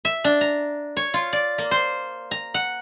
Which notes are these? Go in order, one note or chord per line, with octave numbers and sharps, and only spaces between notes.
E5
D4
A#5
C#5
F4
D5
A#3
C5
A#5
F#5